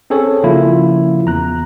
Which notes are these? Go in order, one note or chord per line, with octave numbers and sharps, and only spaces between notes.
C4 C#4 G#4 A4 C#5
C#3 F3 A#3 E4 F4
E2 A#5 F#6